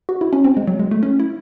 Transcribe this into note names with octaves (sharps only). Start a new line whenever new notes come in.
F#4
E4
C#4
C4
G#3
F#3
G#3
A3
C#4
E4